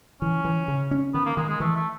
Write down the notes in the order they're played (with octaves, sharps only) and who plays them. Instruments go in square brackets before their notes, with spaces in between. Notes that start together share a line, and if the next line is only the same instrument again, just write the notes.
[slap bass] E3 [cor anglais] C#4
[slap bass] E3
C#3
C#4
[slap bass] D#3 [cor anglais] B3
[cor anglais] A#3
[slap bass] D#3 [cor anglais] G#3
[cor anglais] G#3
[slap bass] E3 [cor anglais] A3
[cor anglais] A3